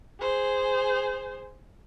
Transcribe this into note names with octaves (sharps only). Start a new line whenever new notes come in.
G#4 C5